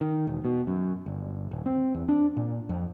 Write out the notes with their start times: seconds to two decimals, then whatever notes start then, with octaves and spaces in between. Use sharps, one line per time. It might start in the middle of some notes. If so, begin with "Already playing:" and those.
0.01 D#3
0.27 E1
0.45 B2
0.67 F#2
1.06 G1
1.51 D#1
1.66 C4
1.94 E2
2.09 D4
2.37 A#2
2.69 F2